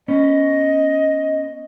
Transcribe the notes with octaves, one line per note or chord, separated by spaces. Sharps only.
B3 C#4 D#5